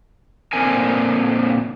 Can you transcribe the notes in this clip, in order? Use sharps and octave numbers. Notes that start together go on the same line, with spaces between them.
A#2 D3 G3 C4 A#4 G#5